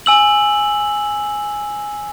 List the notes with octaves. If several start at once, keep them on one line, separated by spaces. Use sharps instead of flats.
G#5 E6 F#7